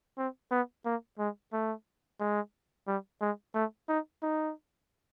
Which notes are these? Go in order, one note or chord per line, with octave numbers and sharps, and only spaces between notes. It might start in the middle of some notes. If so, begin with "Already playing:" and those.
C4
B3
A#3
G#3
A3
G#3
G3
G#3
A3
D#4
D#4